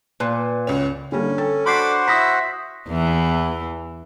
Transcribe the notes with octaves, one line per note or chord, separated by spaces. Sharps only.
A#2 B4
C#2 C#4
D3 G3 A#3 C#4
A4 G5 A6
D4 F#4 C5 F#5 B5 C6 D6 C7
E4 E5 B5 D#6 A#6 B6
E2 E3